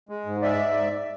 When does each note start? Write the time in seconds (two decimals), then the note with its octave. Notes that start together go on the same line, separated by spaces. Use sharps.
0.09 G#3
0.26 G#2
0.42 G#3 D5 E5
0.59 G#2
0.75 G#2